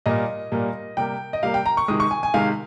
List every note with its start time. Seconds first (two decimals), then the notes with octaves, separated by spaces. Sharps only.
0.06 A#2 G3 A#3 D#5
0.52 A#2 G3 A#3
0.97 C3 G3 A#3 G5
1.33 D#5
1.43 C3 G3 A#3 F5
1.54 G5
1.66 A#5
1.77 C#6
1.88 C3 D#3 G#3 D#6
2.00 C#6
2.11 G#5
2.23 G#5
2.34 C3 D#3 G#3 F5